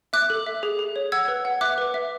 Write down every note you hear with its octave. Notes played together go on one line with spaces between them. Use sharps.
E5 D6 F#6
A4
E5
G#4
G#4
C#5
F#5 E6 G#6
B4
F#5
E5 D6 F#6
B4
E5